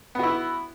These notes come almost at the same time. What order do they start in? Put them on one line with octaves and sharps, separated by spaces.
B3 F#4 E4